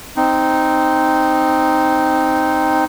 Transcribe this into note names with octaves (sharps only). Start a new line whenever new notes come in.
C4 D#4